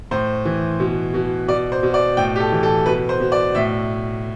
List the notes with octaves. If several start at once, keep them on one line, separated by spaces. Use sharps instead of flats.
A2 C5
E3
B2
B2
B2 D5
C5
B2
D5
A2 G5
G4
A4
E3
A4
B2 B4
C5
B2
D5
A2 E5